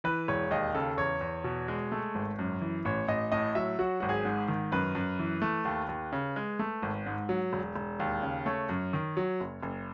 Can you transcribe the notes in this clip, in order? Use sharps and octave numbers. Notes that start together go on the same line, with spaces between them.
E3 B4
E1 C#5
D#2 D#5
C#3 A4
E2 C#5
E2
B2
G#3
A3
G#1
F#2
E3
A1 C#5
A1 D#5
A2 D#5
F#3 E5
F#3 F#4
G#1 F#4
G#4
G#2
D#3
F#2 B4
F#2
E3
A3
D#2
D#2
C#3
G#3
A3
G#1
G#2
F#3
E1
E1
D#2
C#3
A3 C#5
F#2
D#3
F#3
F#1
F#1